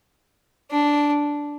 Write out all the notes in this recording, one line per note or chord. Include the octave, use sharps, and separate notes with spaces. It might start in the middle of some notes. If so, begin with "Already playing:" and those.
D4